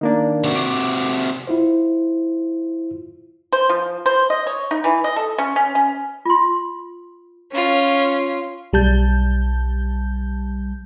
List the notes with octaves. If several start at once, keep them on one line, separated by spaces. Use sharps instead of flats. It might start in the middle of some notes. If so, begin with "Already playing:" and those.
D#3 A#3 D4
C3 F#4
D6
E4 F4 C5
C5
F3
C5
D#5
C#5
D#4
E3
D#5
A4
C#4
C#4
C#4
F4 C6
C#4 F4
B1 G3 A5 G6